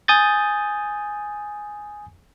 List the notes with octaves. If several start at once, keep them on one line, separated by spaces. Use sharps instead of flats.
G#5 D#6 G6 A6